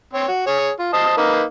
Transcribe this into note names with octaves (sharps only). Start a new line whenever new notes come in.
C4 C#5
F#4
G#4 C#5
F4
C5 D#5 A5
A#3 D#4 B4